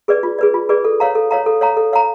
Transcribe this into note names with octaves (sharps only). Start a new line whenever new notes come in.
G#4 B4 D5
F4
G#4 B4 D5
F4
G#4 B4 D5
A4
C#5 F5 A#5
A4
C#5 F5 A#5
A4
C#5 F5 A#5
A4
C#5 F5 A#5